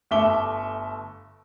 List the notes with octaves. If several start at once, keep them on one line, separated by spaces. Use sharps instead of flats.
G1 A3 E5 D6 G7